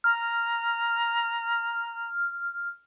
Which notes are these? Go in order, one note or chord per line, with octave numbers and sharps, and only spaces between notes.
A#5 F6